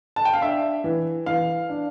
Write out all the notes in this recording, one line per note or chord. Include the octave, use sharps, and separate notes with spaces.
A5
G5
F5
D4 E5
E3
E3 F5
D4